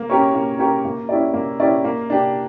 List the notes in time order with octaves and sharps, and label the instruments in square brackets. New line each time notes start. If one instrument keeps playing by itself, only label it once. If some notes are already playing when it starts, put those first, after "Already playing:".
Already playing: [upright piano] A#3
C#4 G4 A#4 C#5
A#3
C#4 G4 A#4 C#5
A#3
C#4 E4 G4 D5
A#3
C#4 E4 G4 D5
A#3
D4 G4